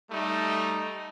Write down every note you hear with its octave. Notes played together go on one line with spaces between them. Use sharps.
G3 A3 D#4